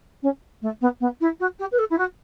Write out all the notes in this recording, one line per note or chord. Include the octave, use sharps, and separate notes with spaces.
C#4
A3
B3
B3
E4
F#4
G4
B4
A4
E4
F#4